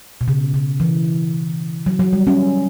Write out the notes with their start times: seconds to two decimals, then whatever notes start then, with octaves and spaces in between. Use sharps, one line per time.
0.21 B2
0.28 C#3
0.54 C#3
0.80 E3
1.86 F#3
2.00 F#3
2.13 G3
2.27 C#4